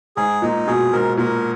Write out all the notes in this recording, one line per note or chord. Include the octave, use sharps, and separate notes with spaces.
G#2 G#4
A#2 D#4
B2 G#4
G#2 A#4
A#2 A#4